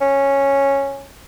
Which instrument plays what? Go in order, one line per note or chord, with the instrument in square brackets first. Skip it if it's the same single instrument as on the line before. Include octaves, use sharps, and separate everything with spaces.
[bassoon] C#4